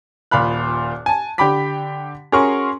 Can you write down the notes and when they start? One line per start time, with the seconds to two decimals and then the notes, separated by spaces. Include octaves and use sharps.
0.31 D#1 A#2 F5 B5 F#6
1.06 G#5 A5
1.38 D3 G4 G5 B5 D6 B6
2.32 C#4 F#4 G#4 A#4 C6 C#6